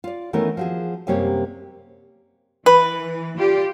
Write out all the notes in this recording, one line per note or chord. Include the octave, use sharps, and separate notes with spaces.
F4 D5
D#3 E3 A3 B3 C#4 A#4
F3 F#4 G#4
F#2 C3 G3 A#3 G4 C#5
E3 B4
F4 G4 D5